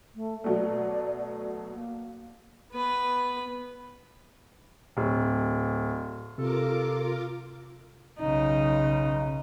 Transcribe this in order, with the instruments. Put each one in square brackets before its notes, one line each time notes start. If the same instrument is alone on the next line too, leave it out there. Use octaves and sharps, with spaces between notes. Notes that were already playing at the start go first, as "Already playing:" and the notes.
[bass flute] A3
[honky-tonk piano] B2 F#3 A3 [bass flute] D5
[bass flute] A#3
[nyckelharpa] B3 B4
[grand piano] D1
[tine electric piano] C3 [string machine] F4 A#4 D6 [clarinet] A4
[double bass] B1 C#3 [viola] D#4